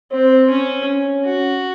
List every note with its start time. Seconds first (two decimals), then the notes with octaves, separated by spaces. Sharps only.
0.12 C4 C5
0.50 C#4
0.88 C#4
1.25 F#4